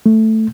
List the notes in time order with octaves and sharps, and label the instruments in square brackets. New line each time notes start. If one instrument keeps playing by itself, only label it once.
[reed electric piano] A3